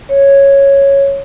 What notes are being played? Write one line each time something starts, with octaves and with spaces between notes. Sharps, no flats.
C#5